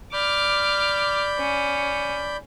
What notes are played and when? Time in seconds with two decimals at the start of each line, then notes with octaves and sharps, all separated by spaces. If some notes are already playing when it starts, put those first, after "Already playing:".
0.13 D5 B5 D6 F6 G6
1.39 C#4